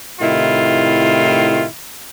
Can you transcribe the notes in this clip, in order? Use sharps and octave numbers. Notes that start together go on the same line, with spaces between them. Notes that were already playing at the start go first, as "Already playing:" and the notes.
A2 C3 D#3 E4 F4